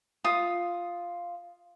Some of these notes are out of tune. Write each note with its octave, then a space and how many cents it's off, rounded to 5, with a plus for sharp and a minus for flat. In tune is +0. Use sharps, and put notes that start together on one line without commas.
F4 +0 D#6 +0